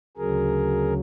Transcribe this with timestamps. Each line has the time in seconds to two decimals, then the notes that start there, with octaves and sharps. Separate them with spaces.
0.17 D2 C#3 F#3 G#4 A#4